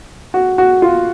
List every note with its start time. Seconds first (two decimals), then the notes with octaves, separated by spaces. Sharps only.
0.34 F#4
0.58 F#4
0.82 F4